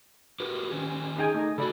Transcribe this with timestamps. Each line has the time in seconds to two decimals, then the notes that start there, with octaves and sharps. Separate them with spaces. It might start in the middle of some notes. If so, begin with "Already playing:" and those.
0.40 F#4 G4 A#4 B4
0.70 D#3 C#4 G4
1.18 D#4 G#4 G5 G#5
1.34 A3 D#4
1.58 C#3 F#4 A4 D5 B5